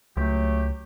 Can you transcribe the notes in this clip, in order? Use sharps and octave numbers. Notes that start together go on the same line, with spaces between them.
C#2 F#3 A3 G4